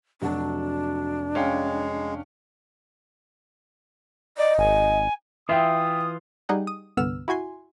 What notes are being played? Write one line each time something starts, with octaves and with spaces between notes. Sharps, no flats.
F1 F#3 D4 F#4 A5
G#3 C#4 F5 G5
D5 D#5
G#1 G#5
E3 F4 E5 G5 D#6
G3 D#4 G#4 D#5 F#5 G5
D#6
C2 G2 D3 B3 E6 F6
E4 F#4 G#5 C6